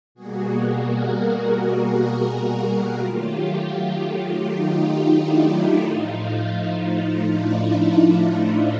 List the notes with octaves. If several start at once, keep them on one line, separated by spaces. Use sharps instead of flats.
B2 G3 A#3 F#4 G#4
G#4 A#4
F#4 G#4
D#3 F#3 A3 F4 G4
D#4 F4
D4 E4
A2 F3 A3 D#4 F4
D#4 F4
D#4 F4
D4 E4
D4 E4
D#4